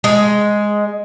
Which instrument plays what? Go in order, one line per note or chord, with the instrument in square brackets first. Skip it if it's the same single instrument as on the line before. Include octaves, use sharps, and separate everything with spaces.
[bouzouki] G#3